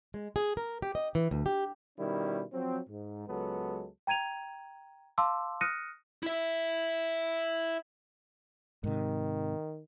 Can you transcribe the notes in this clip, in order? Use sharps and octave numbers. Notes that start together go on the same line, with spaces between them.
G#3
G#4
A#4
G4
D#5
E3
D2
G4
B2 D#3 G3 C#4 E4
F3 F#3 C4
G#2
C#2 F#3 G#3 B3 A4
G5 A#5 G#6 D#7 F7
F5 A5 C6 D6 E6
D#6 F6 F#6 A#6 C#7 D#7
E4 E5
G#2 C3 D#3